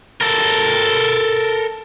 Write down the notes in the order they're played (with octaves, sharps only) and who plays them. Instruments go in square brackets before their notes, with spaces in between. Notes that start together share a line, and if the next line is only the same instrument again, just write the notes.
[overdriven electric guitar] A4 A#4